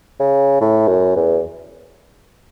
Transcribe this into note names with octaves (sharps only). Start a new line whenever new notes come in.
C#3
A2
F#2
E2